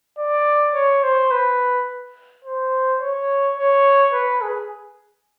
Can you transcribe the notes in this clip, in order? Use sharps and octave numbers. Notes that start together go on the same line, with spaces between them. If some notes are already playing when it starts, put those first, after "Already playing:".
D5
C#5
C5
B4
C5
C#5
C#5
B4
G#4